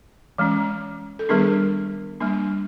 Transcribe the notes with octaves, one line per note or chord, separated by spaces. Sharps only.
E3 G#3 C#4
A4
D#3 G3 B3 D4 G#4 A#4
G3 A#3 D4